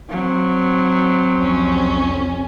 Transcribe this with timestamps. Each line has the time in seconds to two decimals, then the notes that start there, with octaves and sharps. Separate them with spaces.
0.10 F#3 C4
1.35 C2 F2 C#4